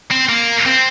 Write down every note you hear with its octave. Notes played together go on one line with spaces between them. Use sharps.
C4
A#3
C4